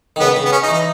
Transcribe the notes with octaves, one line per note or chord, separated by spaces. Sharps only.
D#3
C#3 B3
C#3
B3
C#4
D#4
E3
D#4